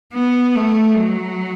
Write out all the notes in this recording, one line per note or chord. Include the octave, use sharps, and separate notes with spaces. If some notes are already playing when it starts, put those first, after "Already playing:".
B3
A3
F#3